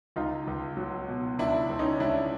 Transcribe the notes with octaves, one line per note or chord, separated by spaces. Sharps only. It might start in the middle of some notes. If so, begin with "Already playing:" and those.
C#2 D#4 F4
C#2
F#3
B2
C#2 D4 E4
C#2
C#4 D#4
C#2 D4 E4